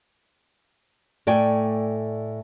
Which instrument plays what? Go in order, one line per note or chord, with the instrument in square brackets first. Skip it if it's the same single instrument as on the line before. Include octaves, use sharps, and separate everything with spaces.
[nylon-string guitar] A2 A3 D5 G5 G#5